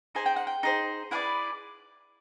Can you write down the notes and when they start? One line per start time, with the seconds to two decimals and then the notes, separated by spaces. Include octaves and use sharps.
0.15 D#4 G#4 C5 G#5
0.26 G5
0.36 F#5
0.47 G5
0.63 D#4 G#4 C5
1.11 E4 G#4 B4 D5 F#5